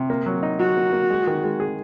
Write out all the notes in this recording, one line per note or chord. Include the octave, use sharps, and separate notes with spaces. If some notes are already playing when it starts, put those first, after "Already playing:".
Already playing: C3
A#3
F#3
D#4
F#3 F#4
A#3
A#3
G#3
D#3
G#3
G#4